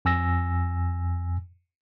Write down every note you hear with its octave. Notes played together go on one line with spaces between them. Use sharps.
F2 G#5 E6 A#6